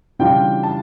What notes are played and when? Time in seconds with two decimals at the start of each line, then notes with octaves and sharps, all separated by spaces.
0.19 C#3 E3 G3 D4 F4 G5
0.63 A5